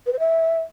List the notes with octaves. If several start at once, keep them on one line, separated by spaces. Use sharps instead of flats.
B4
C5
E5